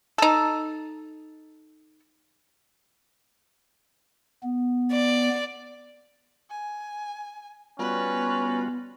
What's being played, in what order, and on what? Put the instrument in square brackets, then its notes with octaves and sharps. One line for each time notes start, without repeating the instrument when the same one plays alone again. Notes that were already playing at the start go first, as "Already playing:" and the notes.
[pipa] D#4 A4
[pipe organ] B3
[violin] D5
[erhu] G#5
[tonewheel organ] G3 F4 F#4 [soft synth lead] B3 [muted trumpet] C#4 [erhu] B4